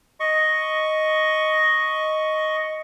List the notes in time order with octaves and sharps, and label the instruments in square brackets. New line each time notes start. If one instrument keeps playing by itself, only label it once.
[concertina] D#5 C#6